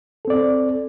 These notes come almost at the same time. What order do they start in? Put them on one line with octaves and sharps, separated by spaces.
A4 C4 D5